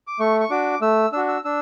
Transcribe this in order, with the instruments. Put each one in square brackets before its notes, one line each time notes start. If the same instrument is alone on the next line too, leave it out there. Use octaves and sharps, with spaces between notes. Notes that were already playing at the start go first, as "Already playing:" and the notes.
[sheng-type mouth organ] D6
A3 C#6
C#6
D4 F#4 D6
A3 E6
D4 E6
F#4
E6
D4 E6